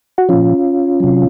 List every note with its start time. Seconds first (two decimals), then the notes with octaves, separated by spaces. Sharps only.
0.18 F#4
0.29 A#2 F3 C#4 F4
1.00 C3 F#3